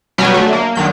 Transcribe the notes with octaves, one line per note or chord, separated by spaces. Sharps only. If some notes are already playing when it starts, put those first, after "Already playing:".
B2 F#3 G3 C#4 G4 G#5
D3 F#3 A3
A#3
D3 D#3 F#3 G6